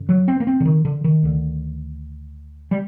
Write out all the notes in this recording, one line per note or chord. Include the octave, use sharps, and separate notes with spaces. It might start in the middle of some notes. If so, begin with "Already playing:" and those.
Already playing: F#2 D3
F#3
C4
A#3
C4
D3
D#3
D3
D#3
D2 D3
G3